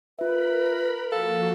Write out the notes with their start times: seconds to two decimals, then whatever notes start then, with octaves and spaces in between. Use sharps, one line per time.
0.19 F4 A#4 B4 E5 B5
1.12 F3 A#3 F#4 A4 F5